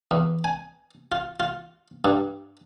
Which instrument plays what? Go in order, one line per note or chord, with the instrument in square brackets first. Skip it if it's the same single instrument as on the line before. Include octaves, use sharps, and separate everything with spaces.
[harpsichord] E2
G#5
F4
F4
G2